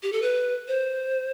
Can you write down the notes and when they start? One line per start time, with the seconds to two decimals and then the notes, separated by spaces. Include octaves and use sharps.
0.03 G4
0.13 A4
0.22 B4
0.68 C5